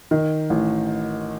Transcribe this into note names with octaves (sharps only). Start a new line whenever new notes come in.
D#3
A1